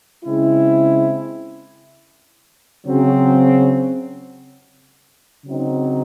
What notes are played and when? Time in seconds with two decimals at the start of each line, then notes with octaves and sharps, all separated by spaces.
0.25 C#3 G#3 C4 E4
2.86 C#3 F#3 C4
5.45 C#3 F#3 C4 D#4